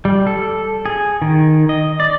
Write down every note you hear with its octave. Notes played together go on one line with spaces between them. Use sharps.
G3
A4
G#4
D#3
D#5
D5